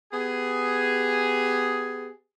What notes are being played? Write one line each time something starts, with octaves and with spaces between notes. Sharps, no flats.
B3 G4 G#4